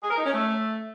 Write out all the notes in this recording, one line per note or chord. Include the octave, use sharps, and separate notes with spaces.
G#4
A#4
D#4
C#4
A3